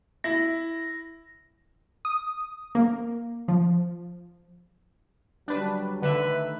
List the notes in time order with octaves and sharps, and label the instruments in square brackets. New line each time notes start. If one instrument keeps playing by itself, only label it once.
[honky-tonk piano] E4 [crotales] A#6
[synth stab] D#6
A#3
F3
[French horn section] D3 F#3 G3 [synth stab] D4 B4
[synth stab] D3 E5 [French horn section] D#3 A3 [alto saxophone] B4